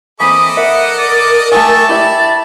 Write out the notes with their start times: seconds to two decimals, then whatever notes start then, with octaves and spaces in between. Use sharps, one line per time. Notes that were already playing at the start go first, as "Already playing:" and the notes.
0.20 E3 A#3 C4 A4 D#5 B5 D6 D#6
0.57 A#4 E5 F#5
0.98 D5
1.52 A3 F4 G4 E5 G#5 A5 C#6
1.89 E4 G4 D5 E5 B5